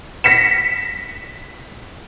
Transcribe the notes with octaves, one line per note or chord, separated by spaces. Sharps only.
A#6 B6 C#7 E7